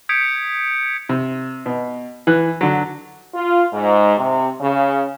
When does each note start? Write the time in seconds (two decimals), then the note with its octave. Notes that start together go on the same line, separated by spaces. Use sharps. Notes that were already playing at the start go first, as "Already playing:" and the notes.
0.09 D#6 G6 G#6 B6 C#7 D7
1.09 C3
1.66 B2
2.27 E3 F#6
2.61 D3 F#3
3.34 F4
3.72 G#2
4.17 C3
4.61 C#3